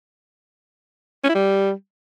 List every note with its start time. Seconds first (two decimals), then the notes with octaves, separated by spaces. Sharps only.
1.24 C#4
1.29 E4
1.35 G3